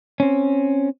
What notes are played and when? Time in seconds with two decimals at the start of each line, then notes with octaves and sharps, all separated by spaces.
0.20 C4 C#4